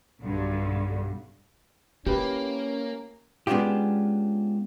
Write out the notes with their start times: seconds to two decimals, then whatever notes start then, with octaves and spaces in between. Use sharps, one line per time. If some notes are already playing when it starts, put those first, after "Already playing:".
0.21 B1 G2 D3
2.06 A#3 C#4 E4 G4 B4
3.47 G#3 B3 C#4 D4 F4 G4